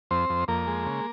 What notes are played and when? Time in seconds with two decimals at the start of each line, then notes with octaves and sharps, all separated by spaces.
0.11 F2 C4 C5
0.29 F2
0.48 F2 A#3 A#4
0.67 G#3
0.86 C#3